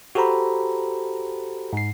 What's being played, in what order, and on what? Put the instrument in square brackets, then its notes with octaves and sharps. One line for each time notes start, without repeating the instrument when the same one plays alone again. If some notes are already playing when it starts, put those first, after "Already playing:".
[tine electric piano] F#4 G4 A4 C5 A#5 B5
G#2 C7